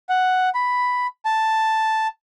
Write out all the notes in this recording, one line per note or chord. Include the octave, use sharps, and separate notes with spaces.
F#5
B5
A5